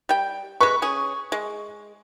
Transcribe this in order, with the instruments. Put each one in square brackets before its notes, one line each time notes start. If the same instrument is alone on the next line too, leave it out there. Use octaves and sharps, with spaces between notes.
[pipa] G3 G5
[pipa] G#3 B4 [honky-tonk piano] C#6
[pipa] C#4 G#4
G#3